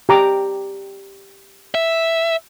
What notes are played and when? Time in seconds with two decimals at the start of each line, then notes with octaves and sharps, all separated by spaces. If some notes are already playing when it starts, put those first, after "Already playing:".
0.09 G4 A#5 D6
1.75 E5